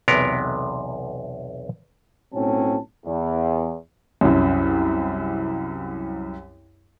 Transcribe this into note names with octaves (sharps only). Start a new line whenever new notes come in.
B1 E2 C3 B3 A#4
B1 A2 F#3 C4 C#4 A5
E2
C2 F#2